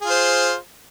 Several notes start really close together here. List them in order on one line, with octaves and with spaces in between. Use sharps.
G#4 F4 C5